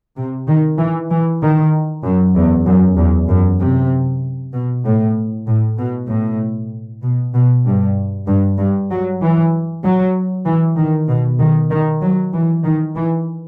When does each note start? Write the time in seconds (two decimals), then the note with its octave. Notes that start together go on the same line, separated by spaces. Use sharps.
0.17 C3
0.48 D#3
0.79 E3
1.10 E3
1.41 D#3
2.03 F#2
2.35 E2
2.66 F#2
2.97 E2
3.29 F#2
3.60 C3
4.53 B2
4.84 A2
5.46 A2
5.78 B2
6.09 A2
7.03 B2
7.34 B2
7.65 G2
8.27 G2
8.58 G2
8.90 F#3
9.21 E3
9.83 F#3
10.45 E3
10.77 D#3
11.08 B2
11.39 D#3
11.70 D#3
12.01 F#3
12.33 E3
12.64 D#3
12.95 E3